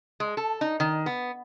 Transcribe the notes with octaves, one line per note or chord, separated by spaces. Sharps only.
G#3
A4
D#4
D#3
B3